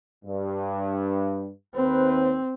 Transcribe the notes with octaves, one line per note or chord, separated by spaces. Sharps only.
G2
D#2 C4 B4 C5